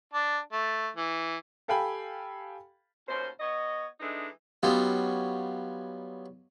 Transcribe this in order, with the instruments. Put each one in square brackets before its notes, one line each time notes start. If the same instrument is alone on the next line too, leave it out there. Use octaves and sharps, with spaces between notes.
[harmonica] D4
A3
E3
[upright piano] G4 A4 F5 G5 G#5 B5
[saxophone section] D#2 B2 C#4 C5
B3 C#5 D#5
E3 G#3 A3 D4 D#4
[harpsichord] F#3 G3 B3 C#4 D#4 F4